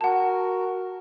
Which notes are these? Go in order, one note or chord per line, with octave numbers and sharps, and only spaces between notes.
F#4 A#4 F#5 A5